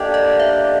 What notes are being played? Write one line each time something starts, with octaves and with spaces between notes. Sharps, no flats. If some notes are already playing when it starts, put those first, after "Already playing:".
Already playing: A#3 D4 G4 A4 D5 D#5
D#5
E5